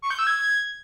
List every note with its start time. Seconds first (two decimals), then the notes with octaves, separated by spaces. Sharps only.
0.02 C#6
0.10 G6
0.19 E6
0.27 G#6